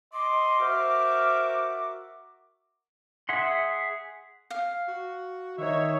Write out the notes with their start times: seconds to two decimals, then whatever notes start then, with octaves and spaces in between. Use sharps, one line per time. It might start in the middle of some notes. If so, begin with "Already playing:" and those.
0.13 D#5 C6 D6
0.60 F#4 A#4 C5 E5 F6
3.29 G#4 E5 F#5 C6
4.50 F5
4.88 F#4
5.58 D#3 D#4 C#5 E5